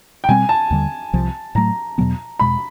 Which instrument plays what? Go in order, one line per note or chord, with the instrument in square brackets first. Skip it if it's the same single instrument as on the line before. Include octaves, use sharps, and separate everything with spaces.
[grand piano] G5
[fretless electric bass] B2 G3 C4 [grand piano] G#5
[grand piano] A5
[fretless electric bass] D#2 D3 G3
C2 C3 F3
[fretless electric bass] A2 F#3 A3 [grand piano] A#5
[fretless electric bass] E2 B2 F#3 B3
[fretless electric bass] E2 B2 G#3 [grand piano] B5